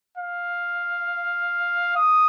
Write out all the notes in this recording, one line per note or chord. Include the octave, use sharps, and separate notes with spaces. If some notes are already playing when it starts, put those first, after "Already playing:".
F5
D#6